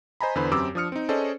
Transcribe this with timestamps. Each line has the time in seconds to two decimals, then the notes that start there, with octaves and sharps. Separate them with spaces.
0.21 C5 D#5 G#5 A#5 B5
0.35 E2 D3 B4 C5 B5
0.51 F#2 C4 G4 D6 E6
0.75 F3 D4 D#6 F6 C#7
0.92 C4 D#4
1.09 C#4 G#4 A4 C5 D5 D#5